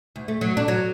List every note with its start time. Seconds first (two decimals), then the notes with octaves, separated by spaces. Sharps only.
0.16 D2
0.28 A3
0.41 F#3
0.57 D4
0.68 F#3